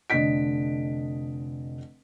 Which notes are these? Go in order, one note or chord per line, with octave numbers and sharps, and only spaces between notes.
F1 D3 D#5 B6 D7